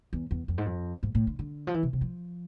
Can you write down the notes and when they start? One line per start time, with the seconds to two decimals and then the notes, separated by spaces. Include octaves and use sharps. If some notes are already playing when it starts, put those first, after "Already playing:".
0.13 E2
0.31 E2
0.48 F2
0.58 G#2
0.66 F2
1.03 G#2
1.15 A2
1.27 D3
1.39 D3
1.67 F3
1.74 E3
1.83 C3
1.93 C3
2.01 F3